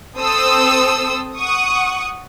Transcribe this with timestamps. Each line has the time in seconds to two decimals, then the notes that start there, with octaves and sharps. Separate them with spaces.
0.16 C4 A4 C5 D#6 E6
1.38 F#5 C#6 D#6